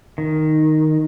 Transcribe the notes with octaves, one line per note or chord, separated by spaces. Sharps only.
D#3